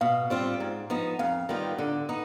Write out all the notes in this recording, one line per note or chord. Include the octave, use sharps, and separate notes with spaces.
B2 F5
G3 C4 F4
G#2
F3 B3 D#4
F2 F5
D#3 G3 B3 F4
D3
B3 D#4